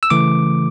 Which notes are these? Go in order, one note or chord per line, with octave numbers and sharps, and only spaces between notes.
E6
C#3 E3 A3 D6